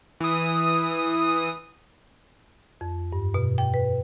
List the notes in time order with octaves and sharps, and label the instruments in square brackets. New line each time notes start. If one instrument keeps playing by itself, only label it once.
[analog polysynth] E3 D#6
[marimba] F2
G2
B2
G5
B4